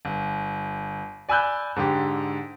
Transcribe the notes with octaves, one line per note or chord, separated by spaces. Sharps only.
G1
D5 G#5 B5 E6 F#6 G6
G#2 D3 G4